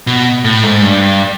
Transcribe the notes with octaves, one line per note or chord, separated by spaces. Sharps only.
B2
A2
G#2
G2